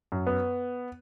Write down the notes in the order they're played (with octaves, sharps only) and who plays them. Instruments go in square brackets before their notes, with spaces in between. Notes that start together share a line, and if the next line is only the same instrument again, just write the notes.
[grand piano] F#2
B3